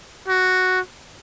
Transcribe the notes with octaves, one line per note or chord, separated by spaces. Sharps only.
F#4